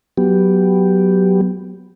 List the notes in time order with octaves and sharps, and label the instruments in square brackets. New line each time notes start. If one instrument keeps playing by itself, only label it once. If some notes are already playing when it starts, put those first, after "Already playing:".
[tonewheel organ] F#3 B3 G4